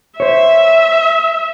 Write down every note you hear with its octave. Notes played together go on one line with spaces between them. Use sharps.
C5 C#5 E5